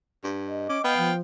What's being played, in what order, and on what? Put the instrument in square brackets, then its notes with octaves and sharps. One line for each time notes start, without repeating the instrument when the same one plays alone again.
[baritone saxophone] G2
[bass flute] D#5
[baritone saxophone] C#4 [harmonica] D6
[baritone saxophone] B3 [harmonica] F5 G5
[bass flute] F3